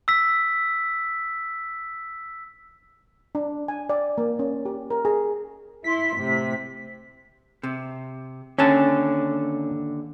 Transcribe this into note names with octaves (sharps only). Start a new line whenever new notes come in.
E6 B6
D4
G#5
D5
A#3
C#4
G4
A#4
G#4
E4 C6 B6
A2 C3
C3
D#2 D3 C#4 A5